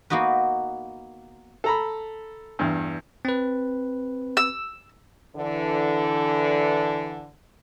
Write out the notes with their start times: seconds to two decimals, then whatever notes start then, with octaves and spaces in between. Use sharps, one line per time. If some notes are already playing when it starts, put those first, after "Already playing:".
0.10 A#3 B3 D#4 F#4 B4
1.64 A4 A#5 B5
2.59 E2 G2
3.25 C4 B4
4.37 E6
5.36 D3 E3